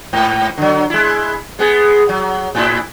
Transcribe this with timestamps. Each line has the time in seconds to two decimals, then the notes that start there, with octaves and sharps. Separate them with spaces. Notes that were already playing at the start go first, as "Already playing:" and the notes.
0.13 G#2
0.57 D3 F#3
0.90 G#3 E4
1.59 G#3 B3 G#4
2.09 F#3
2.55 A2 E4